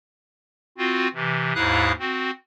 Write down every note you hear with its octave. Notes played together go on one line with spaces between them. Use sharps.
C4 F4 F#4
C3 E3
D#2 G#2 E4 F5 D#6 F#6
C4 F#4